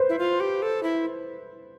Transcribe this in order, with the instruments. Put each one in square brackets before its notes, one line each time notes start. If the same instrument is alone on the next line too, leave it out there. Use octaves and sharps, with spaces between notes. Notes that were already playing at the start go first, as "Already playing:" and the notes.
Already playing: [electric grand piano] B4 C5
[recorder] E4
F4
G4
A4
E4